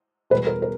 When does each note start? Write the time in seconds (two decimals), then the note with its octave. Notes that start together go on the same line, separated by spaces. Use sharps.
0.30 E2 B2 G3 B4
0.47 A#4
0.62 A#4